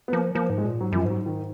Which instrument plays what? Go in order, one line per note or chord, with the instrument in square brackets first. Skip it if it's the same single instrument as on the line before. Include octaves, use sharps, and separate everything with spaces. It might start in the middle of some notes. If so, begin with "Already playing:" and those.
[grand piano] B3
[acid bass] F3 [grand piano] A#3
[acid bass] F3 [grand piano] A#3
[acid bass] G#2
[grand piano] G#3
[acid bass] A#2
[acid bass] G#2 [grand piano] F#3
[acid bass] F#2 [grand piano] F3 F#3
[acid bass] G#2 [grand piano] F#3
[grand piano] D#3